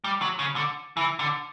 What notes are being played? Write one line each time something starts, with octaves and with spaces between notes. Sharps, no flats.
G3
F#3
C#3
D3
E3
D3